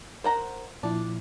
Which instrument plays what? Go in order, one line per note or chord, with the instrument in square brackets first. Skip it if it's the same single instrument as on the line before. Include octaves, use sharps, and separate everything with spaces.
[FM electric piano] A#4 [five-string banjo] C5 F#5 A#5
[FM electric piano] A#2 F3 E4 [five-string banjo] D4